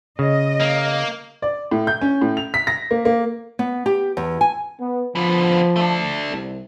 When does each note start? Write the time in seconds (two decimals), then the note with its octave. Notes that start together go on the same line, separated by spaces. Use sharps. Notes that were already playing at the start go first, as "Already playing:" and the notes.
0.19 C#3 D#5
0.61 A#3
1.42 D5
1.71 A2
1.87 G6
2.01 C#4
2.21 A2
2.37 F7
2.54 B6
2.67 A#6
2.91 A#3
3.05 A#3
3.59 B3
3.86 G4
4.17 E2
4.41 G#5
4.80 B3
5.15 D3 F3 B3
5.76 A3 D4
6.30 C2